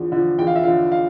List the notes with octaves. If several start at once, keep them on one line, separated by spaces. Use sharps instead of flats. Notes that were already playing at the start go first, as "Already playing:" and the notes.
Already playing: E2 D3 F3
D3 F3
E2 G5
F5
E5
D3 F3 F5
F5